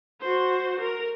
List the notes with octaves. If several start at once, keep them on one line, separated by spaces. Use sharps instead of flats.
F#4 C5
A#4